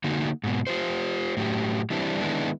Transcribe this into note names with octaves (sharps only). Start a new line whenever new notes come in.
D3 A3 A#3 D#4 F#4
G#2 B2
F4 G4 C5
A2 F#3 G4
E3 G3 C4 D4 E4
D3 D#3 G#3 B3 D4 E4